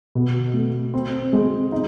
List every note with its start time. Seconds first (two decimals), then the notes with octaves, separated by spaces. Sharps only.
0.15 B2
0.54 A3
0.94 C4
1.33 G#3
1.72 D#4